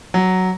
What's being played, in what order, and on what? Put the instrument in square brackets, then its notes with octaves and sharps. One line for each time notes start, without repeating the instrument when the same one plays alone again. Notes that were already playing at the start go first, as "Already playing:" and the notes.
[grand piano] F#3